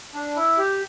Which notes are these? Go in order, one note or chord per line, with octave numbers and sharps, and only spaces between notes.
D4
E4
G4